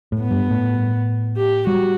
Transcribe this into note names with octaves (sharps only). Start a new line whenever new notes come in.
A2
B3
G2
A2
G4
G3 F#4